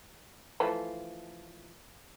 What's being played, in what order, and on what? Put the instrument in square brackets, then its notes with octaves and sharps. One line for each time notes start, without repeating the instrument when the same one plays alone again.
[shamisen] E3 F3 A3